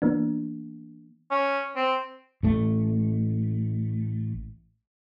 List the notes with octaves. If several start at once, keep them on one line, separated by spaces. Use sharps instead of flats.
E3 A#3 B3 D4
C#4
C4
A1 A3